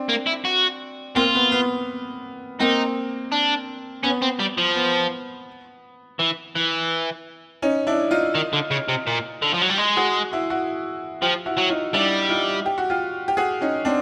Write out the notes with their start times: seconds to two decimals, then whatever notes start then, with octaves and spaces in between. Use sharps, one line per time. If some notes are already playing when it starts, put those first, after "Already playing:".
Already playing: C4 D4
0.09 A#3
0.26 E4
0.45 F#4
1.16 A#3 C4 F4
1.35 B3
1.52 B3
2.60 A#3 C4 D#4
3.32 D4
4.04 B3 C#4
4.22 C4
4.40 G3
4.58 F3
4.75 B3
6.19 E3
6.56 E3
7.62 C#4 D#4
7.87 D4 E4
8.11 D#4 F4
8.35 D#3
8.53 D3
8.71 C#3
8.88 C3
9.07 A#2
9.42 D3
9.54 F3
9.62 F#3
9.70 G3
9.79 G#3
9.96 F#4 G#4
10.32 E4 F#4
10.50 E4 F#4
11.22 F3 F4 G4
11.46 E4 F#4
11.58 F#3
11.69 D#4 F4
11.94 G3 D4 E4
12.29 D#4 F4
12.66 G4
12.78 F#4
12.90 F4 G4
13.28 G4
13.37 F#4 G#4
13.61 C#4 D#4
13.85 C4 D4